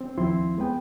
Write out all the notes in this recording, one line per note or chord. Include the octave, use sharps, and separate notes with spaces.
C4
D#2 F3 C4 E4 F4 C6
G#3 B3 B4 G5